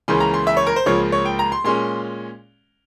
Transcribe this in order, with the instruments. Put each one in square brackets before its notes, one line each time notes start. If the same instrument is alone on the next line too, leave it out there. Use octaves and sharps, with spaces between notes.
[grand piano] C#2 C#3 E3 A#3 C#4 C6
A#5
C6
E5
C#5
A#4
C5
C#2 C#3 F3 A#3 C#5
C#5
G5
A#5
C6
A#2 G#3 C#4 C6